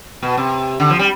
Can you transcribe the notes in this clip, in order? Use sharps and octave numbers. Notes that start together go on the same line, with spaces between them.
B2
C3
D3
F3
G3